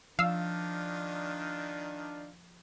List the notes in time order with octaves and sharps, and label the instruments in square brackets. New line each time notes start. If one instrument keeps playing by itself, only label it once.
[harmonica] D#3 D#4 F4 [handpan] F3 [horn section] D4 [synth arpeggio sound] F5 E6